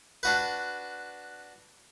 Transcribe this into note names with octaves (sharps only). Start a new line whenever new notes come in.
D4 F#4 B4